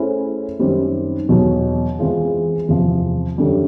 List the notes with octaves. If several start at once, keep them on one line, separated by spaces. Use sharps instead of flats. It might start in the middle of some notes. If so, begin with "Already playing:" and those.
Already playing: A3 C#4 E4 G#4 C5
F#2 D#3 G3 C4
E2 B2 F#3
E3 G#3 C4 F4 G#4
E2 C3 F3
F#2 D3 G3